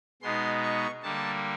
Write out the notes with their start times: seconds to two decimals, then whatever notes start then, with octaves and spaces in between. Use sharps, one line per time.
0.22 B2 G#3 B3 D#4 C6
0.63 C#6
1.03 D3 G3 A#3 A5